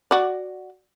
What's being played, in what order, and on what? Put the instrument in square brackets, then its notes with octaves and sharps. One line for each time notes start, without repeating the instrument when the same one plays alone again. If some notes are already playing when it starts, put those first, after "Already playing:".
[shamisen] F#4 D5